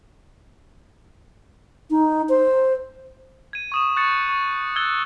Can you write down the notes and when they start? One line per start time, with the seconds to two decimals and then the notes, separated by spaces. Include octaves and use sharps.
1.91 D#4
2.29 C5
3.53 G#6 D#7
3.72 C#6 D#6 E7
3.96 C#6 F#6 G6 A6 C#7
4.29 C#6 D#7
4.76 E6 F#6 G#6 A6 G7